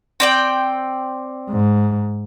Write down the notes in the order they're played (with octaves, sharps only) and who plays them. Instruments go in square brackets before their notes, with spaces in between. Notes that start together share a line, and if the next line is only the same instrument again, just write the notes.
[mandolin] C4 D5 G5
[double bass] G#2